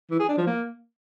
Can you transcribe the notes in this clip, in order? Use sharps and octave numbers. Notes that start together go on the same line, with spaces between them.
E3
G#4
D4
F3
A#3